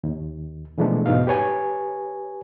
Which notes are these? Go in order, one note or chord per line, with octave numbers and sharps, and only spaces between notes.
D#2
B2 E3 F3 G#3 A3 D4
E2 G#2 B2 D#4 F5
G4 B4 C#5 G#5